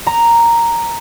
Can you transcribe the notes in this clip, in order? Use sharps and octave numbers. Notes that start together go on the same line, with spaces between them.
A#5